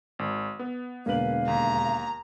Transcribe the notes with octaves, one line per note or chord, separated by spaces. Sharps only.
G#1
B3
E1 D3 A#3 B4 F5 F#7
D#2 A#5